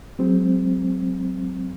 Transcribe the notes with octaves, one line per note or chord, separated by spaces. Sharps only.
F#3 G#3 C4